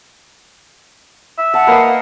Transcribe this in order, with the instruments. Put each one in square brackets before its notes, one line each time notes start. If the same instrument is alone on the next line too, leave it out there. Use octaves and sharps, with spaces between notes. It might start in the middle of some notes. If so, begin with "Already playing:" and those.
[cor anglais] E5
[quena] F#5 [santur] A5
[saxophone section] A#3 [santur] B4 D#5